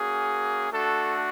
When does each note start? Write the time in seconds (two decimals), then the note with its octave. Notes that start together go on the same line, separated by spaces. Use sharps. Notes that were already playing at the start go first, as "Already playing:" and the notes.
Already playing: A#3 C#4 F#4 G#4
0.71 A3 D4 F#4 A4